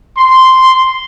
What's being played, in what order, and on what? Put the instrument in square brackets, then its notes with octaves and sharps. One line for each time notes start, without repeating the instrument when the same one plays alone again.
[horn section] C6